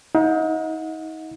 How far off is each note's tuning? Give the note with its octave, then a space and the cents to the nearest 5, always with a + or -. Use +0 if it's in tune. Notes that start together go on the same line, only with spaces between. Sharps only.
D#4 +30 F#5 -40